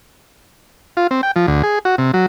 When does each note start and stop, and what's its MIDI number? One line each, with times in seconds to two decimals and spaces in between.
0.97 1.07 65
1.11 1.21 60
1.23 1.31 79
1.36 1.46 53
1.47 1.62 38
1.63 1.79 68
1.85 1.96 66
1.98 2.12 48
2.14 2.26 54